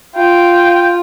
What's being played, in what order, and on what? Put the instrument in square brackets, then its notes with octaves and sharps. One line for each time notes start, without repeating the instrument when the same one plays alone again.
[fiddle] F4 [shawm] G5